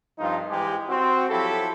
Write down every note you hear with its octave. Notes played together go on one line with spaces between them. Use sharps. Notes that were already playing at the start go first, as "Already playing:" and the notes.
C2 G2 F3 D4 D#4 F4
G#2 E3 G#3 G4
C4 F#4
F3 F#3 E4 G4 A4